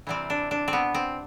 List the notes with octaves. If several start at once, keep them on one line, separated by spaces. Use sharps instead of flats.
C3 E3 G3 C4
D4
D4
C4
B3
C4